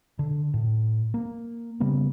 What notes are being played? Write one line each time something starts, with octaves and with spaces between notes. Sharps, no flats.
D3
A2
A#3
C#3 G3 A#3 B3